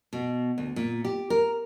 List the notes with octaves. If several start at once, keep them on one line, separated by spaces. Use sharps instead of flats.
B2
D2
A#2
G4
A#4